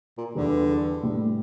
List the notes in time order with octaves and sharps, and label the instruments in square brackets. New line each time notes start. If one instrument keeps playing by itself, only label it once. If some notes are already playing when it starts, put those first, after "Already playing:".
[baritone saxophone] A#2
[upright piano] E2 E3 G3 [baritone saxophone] D3
[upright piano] A2 G3 D4 A4 D5